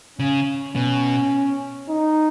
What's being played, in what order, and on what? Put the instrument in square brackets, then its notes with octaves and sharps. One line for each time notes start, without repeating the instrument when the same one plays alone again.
[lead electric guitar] C#3 [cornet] C#4
[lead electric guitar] B2 [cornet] C#4
[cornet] D#4